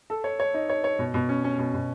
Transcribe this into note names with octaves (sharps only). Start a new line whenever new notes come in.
A4
C#5
C#5
D#4
C#5
C#5
B2
B2
C#4
C#4
B2
B2